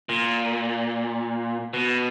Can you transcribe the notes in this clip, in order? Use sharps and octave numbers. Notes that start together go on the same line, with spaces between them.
A#2
B2